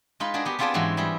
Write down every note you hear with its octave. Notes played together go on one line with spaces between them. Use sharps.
G#3 D#4 F4 B4 B5
D4 F#4 G#4 A#4 D5
B3 G4
B3 C4 F4 G#4 D5 A5
G#2 E3 F#3 G#3 C4 F#4
G3 E4 G#4